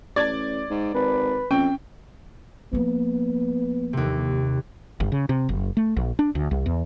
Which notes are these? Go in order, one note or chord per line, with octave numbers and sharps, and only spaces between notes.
A1 D5 G#6 A6
G#2
G#1 B4
F2 C#4 G5
F3 A#3 B3
D#2 C3
G1
C#3
C3
F#1
A3
A#1
D4
D2
C2
E2